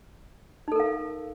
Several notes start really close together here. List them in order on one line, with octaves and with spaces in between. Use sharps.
D#4 A4 A#4 F5